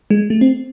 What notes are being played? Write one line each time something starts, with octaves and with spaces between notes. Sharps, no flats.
G#3
A3
C4